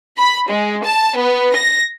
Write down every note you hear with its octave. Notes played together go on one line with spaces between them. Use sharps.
B5
G#3
A5
B3
A#6